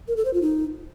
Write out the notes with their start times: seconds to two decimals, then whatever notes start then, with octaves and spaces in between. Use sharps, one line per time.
0.08 A#4
0.17 A4
0.25 C5
0.34 F4
0.42 D#4